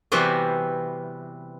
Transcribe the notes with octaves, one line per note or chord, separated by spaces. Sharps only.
C3 E3 G3 B3 C4 F#4